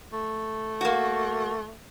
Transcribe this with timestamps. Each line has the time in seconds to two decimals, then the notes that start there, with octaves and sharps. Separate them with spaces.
0.13 A3
0.81 A#3 F#4